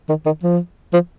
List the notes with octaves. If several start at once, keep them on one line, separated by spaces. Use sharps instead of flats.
D#3
D#3
F3
F3